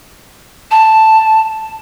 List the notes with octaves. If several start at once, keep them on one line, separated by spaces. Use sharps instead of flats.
A5